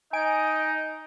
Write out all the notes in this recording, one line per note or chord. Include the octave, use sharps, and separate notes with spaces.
D#4 D#5 G#5 D7